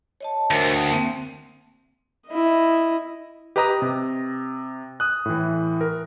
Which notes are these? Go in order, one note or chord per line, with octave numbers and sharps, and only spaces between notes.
C#5 D#5 A5
D2 A#4 C5
G5 A5 D#6
A#3 C4
E4 D#5
G4 B4 D#5 A#5 D#6 A#6
C3
D#6 F#6
A2 E3
A#4